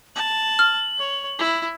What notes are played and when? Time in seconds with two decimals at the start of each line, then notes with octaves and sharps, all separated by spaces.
0.15 A5 F#7
0.59 F6
0.99 C#5
1.39 E4